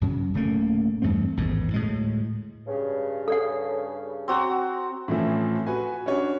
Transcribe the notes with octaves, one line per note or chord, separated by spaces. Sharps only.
F#2 C#3 F#3
D1 C#3 A3 A#3
E2 G2 A3 C4
A1 E2 G#2 D#3
D2 A2 G#3
G2 C#3
A4 D5 F#5
C4 F#4 A#5
A2 E3 F3 A3 C4 C#4
F#4 B4 G#5
C#4 D4 F#4 C#5